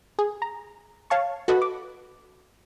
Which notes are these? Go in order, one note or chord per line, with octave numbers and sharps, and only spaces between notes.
G#4
A#5
C#5 F5 A5 C#6
F#4 A4 B4 D#5 A5 B5
D6